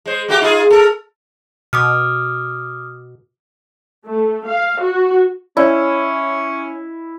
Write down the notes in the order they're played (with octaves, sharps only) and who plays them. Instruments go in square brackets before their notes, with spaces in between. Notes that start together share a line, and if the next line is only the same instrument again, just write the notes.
[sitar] G#3 C5
A3 F#4 G4
D#4 F4 G#4
A4 A#4
[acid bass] B2 [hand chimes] D6 D#6 F6
[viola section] A3
F5
F#4
[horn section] C#4 [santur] E4 [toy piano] C#5 D5